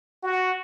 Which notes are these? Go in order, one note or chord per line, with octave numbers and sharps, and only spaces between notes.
F#4